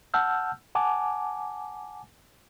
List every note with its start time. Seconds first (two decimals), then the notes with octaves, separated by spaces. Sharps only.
0.14 F#5 A5 E6 F6 G6
0.75 F#5 G#5 A5 D6